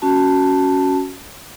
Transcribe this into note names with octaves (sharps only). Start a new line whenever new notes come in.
C#4 F#4 A5